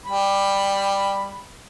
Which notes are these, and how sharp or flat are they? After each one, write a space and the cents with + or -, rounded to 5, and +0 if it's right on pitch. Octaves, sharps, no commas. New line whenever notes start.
G3 +10 B5 +0